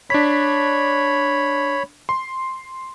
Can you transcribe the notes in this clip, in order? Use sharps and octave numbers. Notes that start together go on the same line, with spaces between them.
D4 C#5 B5 B6
C6